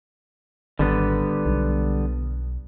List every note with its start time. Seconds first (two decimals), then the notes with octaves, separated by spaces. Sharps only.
0.79 G#1 D3 G3 B3
1.46 B1